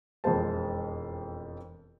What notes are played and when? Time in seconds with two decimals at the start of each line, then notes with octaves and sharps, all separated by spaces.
0.24 E1 F2 G#3 C5 A5